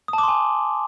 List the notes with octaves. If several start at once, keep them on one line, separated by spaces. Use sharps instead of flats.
D#6
A5
D6
C6
G#5